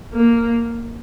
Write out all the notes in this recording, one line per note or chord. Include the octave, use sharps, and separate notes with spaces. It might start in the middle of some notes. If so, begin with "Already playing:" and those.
A#3